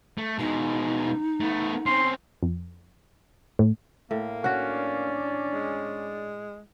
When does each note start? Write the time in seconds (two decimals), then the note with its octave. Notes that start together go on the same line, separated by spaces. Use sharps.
0.18 A3
0.39 B2 G#3 D#4
1.41 A3 B3
1.86 C4 C#4 C6
2.43 F2
3.59 A2
4.11 A2 A#3
4.44 C#4 D4 F#4 D5 F#5
5.53 G#3